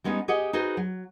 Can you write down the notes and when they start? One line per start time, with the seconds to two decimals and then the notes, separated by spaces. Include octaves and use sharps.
0.04 G3 G#3 B3 C#4 D#4
0.28 G4 G#4 D#5 F#5 G#5
0.53 D#4 F#4 G#4 B4 C5
0.77 F#3